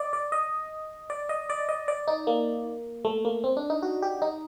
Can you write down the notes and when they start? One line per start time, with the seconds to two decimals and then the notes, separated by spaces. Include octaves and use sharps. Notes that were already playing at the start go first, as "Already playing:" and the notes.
Already playing: D5 D#5
0.13 D5
0.32 D#5
1.10 D5
1.29 D#5
1.50 D5
1.69 D#5
1.88 D5
2.08 D#4
2.27 A#3
3.05 A3
3.25 A#3
3.44 C4
3.57 D4
3.70 D#4
3.83 F#4
4.02 G4
4.22 D#4